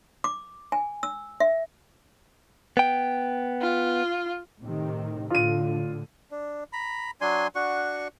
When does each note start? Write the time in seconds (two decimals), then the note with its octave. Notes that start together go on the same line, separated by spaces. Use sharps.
0.24 D6
0.72 G#5
1.03 E6
1.40 E5
2.77 B3 G5
3.61 F4
4.61 A2 C3 D#3
5.30 A2 D3 F4 D#7
6.31 D4
6.73 A#5 B5
7.21 F#3 D4 G#5 C6
7.55 D4 F#4 F#5 C#6